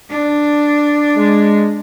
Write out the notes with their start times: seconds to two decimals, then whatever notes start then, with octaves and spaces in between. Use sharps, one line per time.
0.10 D4
1.16 G#3